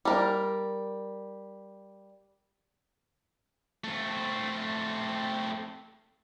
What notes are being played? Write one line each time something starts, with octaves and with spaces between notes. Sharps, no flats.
G3 A#4
A3 C4